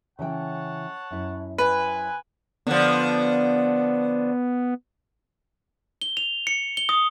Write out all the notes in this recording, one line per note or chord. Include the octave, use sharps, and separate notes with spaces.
C#3 E3 C#5 F#5 G5 A5
F#2 E4
C4 B4 G#5
D3 F3 B3
G7
F7
C#7
G7
D#6